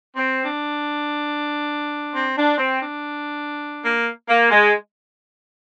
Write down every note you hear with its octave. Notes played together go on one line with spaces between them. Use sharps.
C4
D4
C4
D4
C4
D4
A#3
A#3
G#3